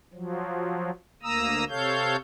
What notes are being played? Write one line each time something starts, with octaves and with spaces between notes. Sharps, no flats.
F3 F#3
D2 A#3 A#5 D#6 E6
C3 A4 C#5 F5 G6